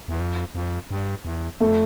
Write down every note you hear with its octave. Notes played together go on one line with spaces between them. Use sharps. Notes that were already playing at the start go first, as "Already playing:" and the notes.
E2
F2
F2
G2
E2
F2 A3